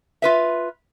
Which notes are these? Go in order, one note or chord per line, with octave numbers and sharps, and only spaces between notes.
F4 B4 E5